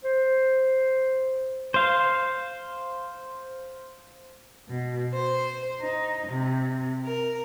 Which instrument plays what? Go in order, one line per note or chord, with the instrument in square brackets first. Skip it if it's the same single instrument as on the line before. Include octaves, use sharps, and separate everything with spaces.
[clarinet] C5
[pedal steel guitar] C5 F5
[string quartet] B2
C5
D#4
C3
A#4